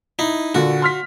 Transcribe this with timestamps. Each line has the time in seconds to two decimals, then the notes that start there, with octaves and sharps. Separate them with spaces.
0.19 D#4 E4
0.55 A#2 D3 F#4
0.82 C6 F6 B6